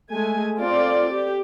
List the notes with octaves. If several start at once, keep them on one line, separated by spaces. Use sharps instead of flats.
G#3 A3 G#5
C4 F4 A4 D5
G4